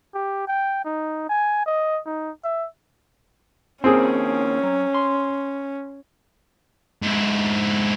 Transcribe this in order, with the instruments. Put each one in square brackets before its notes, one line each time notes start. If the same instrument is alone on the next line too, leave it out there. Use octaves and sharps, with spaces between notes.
[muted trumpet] G4
G5
D#4
G#5
D#5
D#4
E5
[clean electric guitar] D#3 F3 A#3 [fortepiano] C4 G#4 [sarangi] C#4
[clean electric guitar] F#3
C6
[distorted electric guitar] G#2 E4